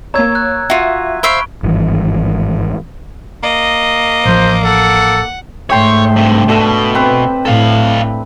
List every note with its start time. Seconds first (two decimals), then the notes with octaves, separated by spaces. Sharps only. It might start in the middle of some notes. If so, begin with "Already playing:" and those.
0.14 A#3 C#5 A#5 E6 G#6
0.35 F#6
0.70 F4 F#4 E5
1.23 C5 E5 F5 B5 C#6 D7
1.63 G#1 G2 E3
3.43 A#3 D#5
4.25 A1 F3 C5
4.64 A4 F#5
5.70 G#2 A3 C#5 E5 G5 C6
6.16 G2 C3
6.48 B2 D4 A4 E5
6.95 C4 B4
7.45 A2 A4 F5